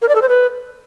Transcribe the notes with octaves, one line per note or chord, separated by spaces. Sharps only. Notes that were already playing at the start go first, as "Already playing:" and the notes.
A#4
D5
A4
C5
B4